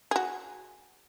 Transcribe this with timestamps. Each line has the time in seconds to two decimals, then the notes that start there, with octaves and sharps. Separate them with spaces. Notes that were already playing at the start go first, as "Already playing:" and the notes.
0.11 F#4 G#4